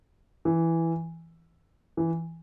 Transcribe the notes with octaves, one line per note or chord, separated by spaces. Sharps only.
E3
E3